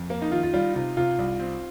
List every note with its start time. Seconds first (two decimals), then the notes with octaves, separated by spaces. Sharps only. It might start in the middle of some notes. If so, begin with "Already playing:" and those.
Already playing: F2
0.10 A#3
0.21 D#4
0.31 D#3 F4
0.43 F4
0.53 G3 F4
0.75 C3 F4
0.97 C3 F4
1.19 C2
1.40 C4